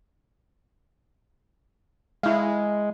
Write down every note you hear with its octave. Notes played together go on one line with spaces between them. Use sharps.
G#3 E4 F5